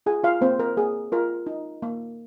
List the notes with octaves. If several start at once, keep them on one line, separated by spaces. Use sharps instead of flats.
F4 G#4 G#5
F4 F5
A#3 C4 C5
A#4
A#3 G#4
F4 A#4
D#4
A#3